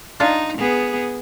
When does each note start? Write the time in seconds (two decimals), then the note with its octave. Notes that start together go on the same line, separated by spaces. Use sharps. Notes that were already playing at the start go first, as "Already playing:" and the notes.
0.20 D4 D#4 F4 A5
0.58 B3 G#4